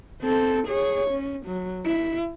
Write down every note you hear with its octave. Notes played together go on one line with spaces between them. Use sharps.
C4 A4
G#4 C#5
C#4
F#3
E4